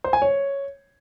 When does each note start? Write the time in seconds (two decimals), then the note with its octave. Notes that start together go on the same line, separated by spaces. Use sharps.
0.04 C5
0.13 G#5
0.22 C#5